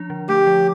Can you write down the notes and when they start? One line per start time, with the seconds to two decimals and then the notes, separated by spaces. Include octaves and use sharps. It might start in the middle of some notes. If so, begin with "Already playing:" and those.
Already playing: F3 D4
0.10 D3
0.29 A3 G4
0.47 F3